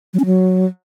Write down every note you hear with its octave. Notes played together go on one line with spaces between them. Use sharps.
F#3
C#4
F#3